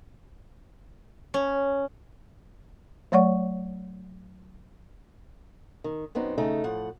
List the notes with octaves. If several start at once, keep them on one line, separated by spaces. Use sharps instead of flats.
C#4
F#3 A3 C#5 D5 F#5 C#6
D#3
F#2 B3 C4 D#4
C#3 A3 D#4
A2 F3 F#5